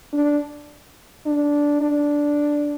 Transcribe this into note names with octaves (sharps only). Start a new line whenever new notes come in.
D4
D4
D4